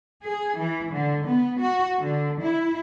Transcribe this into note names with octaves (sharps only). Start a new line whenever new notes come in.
G#4
E3
D3
B3
F#4
D3
E4